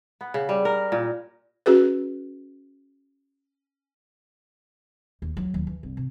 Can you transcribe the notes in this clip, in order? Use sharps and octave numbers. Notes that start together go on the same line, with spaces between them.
B3
C#3
G3
A#4
A#2
C#4 F#4 G#4 B4
D#2
F#3
D#2
E3
C2
C3